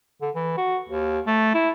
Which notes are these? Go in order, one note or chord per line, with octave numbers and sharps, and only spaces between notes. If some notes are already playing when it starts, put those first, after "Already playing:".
D3
E3
F#4
D#2
A3
E4